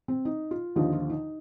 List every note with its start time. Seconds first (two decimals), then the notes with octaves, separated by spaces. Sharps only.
0.08 C4
0.25 D#4
0.51 F4
0.76 D#2 D3 F3 D#4
0.92 F4
1.10 D#4